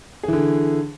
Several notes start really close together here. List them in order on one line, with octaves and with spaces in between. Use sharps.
G#4 E3 D3